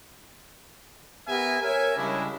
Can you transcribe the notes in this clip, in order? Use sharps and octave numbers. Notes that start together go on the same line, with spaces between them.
B3 G4 A#4 E5 G#5
A#4 C#5 E5 G#5
C#3 G3 G#3 D4 E4